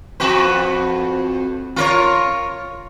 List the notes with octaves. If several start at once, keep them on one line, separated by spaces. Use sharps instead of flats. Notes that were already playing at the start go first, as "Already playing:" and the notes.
F2 F#4 B4
F4 A#4 C#5